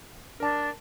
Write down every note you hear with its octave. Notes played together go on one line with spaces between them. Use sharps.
D4 A#4 A5